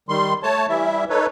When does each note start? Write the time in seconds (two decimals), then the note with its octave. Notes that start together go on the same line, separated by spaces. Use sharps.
0.09 D#3 G3 C6
0.43 A3 C#5 A5
0.69 E3 G3 E4 E5
1.10 D#4 A4 B4 C#5